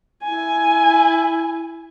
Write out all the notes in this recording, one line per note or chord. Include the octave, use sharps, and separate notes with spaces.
E4 G#5